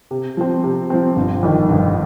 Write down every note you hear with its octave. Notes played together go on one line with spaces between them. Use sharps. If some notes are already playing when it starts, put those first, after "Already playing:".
C3
F3 C4
C3
F3 C4
G1
F2 D#3
G1